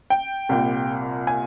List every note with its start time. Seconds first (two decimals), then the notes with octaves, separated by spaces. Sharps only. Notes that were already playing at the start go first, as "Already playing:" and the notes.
0.10 G5
0.49 C2 A#2
1.27 G#5